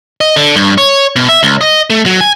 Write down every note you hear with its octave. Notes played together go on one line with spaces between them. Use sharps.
D#5
D3
G2
C#5
B2
E5
C#2
D#5
A3
F#3
G#5